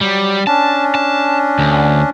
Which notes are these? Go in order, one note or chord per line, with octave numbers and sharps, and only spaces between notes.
F#3 G3
C#4 D4 A5
A5
D2